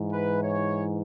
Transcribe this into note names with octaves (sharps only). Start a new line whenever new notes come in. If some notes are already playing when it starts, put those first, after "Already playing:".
Already playing: G#2 E3
B4
C#5